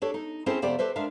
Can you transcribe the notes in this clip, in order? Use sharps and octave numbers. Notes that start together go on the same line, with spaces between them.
D4 G4 A4 C#5
D#4
C4 C#4 E4 G#4 A4 C5
F2 C3 B3 G4 C5 D5
G4 A4 B4 C5 E5
G#3 D4 A#4 E5 F5